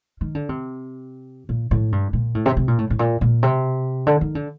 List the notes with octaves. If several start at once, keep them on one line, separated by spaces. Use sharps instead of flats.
D#3
D3
C3
A#2
A2
G2
A#2
A2
C3
C3
A#2
A2
A2
A#2
A#2
C3
D3
D#3
D3